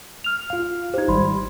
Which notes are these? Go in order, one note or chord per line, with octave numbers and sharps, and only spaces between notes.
F6 F7
F4 F5
D#4 G4 C5 G#6
G#1 G3 B5 C6